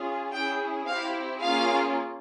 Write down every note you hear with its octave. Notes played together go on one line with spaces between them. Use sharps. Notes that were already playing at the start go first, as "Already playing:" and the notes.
Already playing: C#4 F4 G#4
C#4 E4 G#4 G5
C4 E4 G4 F5
A#3 C#4 F4 G#4 F5